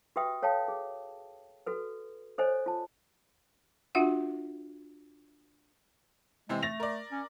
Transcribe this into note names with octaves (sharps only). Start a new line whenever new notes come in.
F#4 G4 B4 E5 G5 D#6
A4 C#5 F5 G5 A5
G#4
F#4 A4 B4
A4 C5 C#5 D#5 G#5
F4 A5
D4 F4 F#4 E5 F#5
C3 E3 G#3 C4
A3 A6 A#6 F7
A#4 D5
C#4